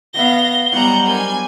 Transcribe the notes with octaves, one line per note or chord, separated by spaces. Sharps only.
B3 F5 A#6 G7
F#3 G3 B3 D#5 F#5 A#5
D4 A#4 C5 G#5